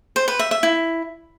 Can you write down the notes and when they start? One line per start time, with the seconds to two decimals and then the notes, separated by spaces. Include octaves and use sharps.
0.16 C5
0.28 B4
0.39 E5
0.51 E5
0.63 E4